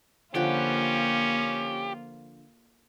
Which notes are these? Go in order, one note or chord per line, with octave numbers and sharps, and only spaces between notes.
D3 F3 A#3 C#4 F4 G4 B4